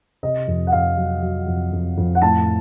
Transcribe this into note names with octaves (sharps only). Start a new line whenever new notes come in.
C3 D#5
F2
F#5
F2 F5
F#3
F#3
F2
F2
F2
F#5
A2 A5